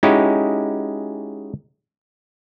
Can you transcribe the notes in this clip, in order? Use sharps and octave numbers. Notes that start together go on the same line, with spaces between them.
G#3 C#4 D#4 E4 F#4 G4